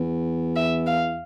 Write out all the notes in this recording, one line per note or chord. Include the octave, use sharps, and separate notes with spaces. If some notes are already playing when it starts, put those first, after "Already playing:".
Already playing: E2
E5
F5